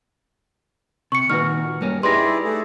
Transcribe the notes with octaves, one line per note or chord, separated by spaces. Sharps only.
C3 C#6 C#7
A#2 D#3 F#4 B4 F6
G2 A#3 C#4
D#4 E4 G4 G#4 B4 D5 C6 A#6
A3 G#4 A4